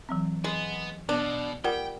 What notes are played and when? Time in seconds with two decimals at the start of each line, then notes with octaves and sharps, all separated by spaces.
0.09 E3 F#3 C4
0.44 G#3 B3
1.09 B2 B3 D4
1.64 G3 F4 A#4 F#5 G5